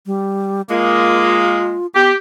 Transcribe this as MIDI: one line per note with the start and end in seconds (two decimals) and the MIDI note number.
0.06 0.62 55
0.69 1.76 56
0.69 1.76 58
0.69 1.87 65
1.95 2.11 59
1.95 2.12 67